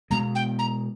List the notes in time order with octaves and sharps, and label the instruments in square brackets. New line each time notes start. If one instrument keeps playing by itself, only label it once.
[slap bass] B2 G#3 B3 [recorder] A#5
[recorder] G5
A#5